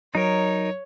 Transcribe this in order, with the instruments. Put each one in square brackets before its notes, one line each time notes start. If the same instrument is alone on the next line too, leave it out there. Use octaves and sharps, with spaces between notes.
[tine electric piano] F#3 [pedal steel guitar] D#4 A#4 [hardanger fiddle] C#5